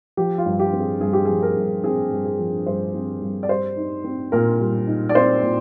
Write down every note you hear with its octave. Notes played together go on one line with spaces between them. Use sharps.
F3 G4
F4
G2
G4
C4
G#4
G2 G#4
G4
F3 G#4
A#4
G2
C4 G#4
G2
G#4
F3
G2 C5
C4
G2
D5
G3 C5
D#4
C4
A#2 A#4
G3
D#4
D5
C4 C5
A#2